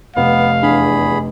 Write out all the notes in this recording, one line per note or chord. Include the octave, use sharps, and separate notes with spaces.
F1 B3 F5
E2 D4 G#4 B5